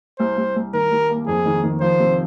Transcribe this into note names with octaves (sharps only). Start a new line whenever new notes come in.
C2 C5
C2
C2
D#3 A#4
G3
A#3
F2 G#4
D#3
D#3
F3 C5
C3